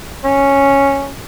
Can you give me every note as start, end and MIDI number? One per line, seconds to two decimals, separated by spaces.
0.24 1.11 61